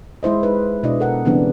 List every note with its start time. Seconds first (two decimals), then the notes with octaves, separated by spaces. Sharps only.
0.23 G#3 E4 C5 D#5
0.43 D#4 B4
0.83 B2 B3 D4 E4 D5 D#5
1.00 A4 A#4 F#5
1.25 C#3 E3 G3 B3 C4 D4